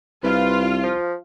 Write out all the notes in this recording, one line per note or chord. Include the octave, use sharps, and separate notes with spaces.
C2 F4 B4
F3